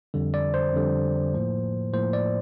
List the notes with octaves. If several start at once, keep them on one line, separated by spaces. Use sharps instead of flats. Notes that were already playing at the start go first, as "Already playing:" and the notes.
F2 D3 G3
D5
C5
F2 D3 G3
A2 F3 A#3
A2 F3 A#3 C5
D5